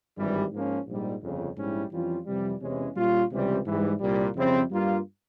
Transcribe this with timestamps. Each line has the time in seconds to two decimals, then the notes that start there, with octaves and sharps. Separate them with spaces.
0.17 G#1 G2 E3 G3
0.52 G#2 F3 A#3 C#4
0.86 A#1 G#2 G3
1.21 G1 F2 C#3
1.56 A#1 G#2 G3 C#4 E4
1.91 F2 E3 G3 C#4 F4
2.26 F2 C3 E3 G3
2.61 E2 C3 E3 G#3 C#4
2.96 A#2 G3 C#4 F4
3.31 C#2 C3 E3 G3 C4
3.66 G#2 E3 G3
4.00 C2 A#2 G3
4.35 F2 C#3 G3 C4 E4
4.71 G2 G3 A#3 F4